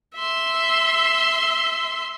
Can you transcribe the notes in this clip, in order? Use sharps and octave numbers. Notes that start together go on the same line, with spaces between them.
E5 C6